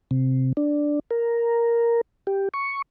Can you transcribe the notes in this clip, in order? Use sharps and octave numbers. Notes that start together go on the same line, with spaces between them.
C3
D4
A#4
G4
C#6